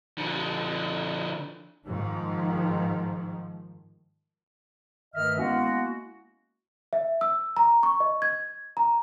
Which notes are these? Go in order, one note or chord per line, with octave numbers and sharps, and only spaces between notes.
D3 F3
G#2 D#3 F3
G2 D#3 A3 D#5 E5 F6
G#3 A#3 B3 C#4 E4 F#4
E5
E6
A#5
C#6
D#5
G#6
A#5